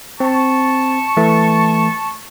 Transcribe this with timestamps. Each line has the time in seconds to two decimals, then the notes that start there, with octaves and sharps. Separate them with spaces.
0.20 C4 A5 C#6
1.17 E3 A3